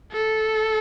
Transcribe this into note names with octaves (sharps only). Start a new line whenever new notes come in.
A4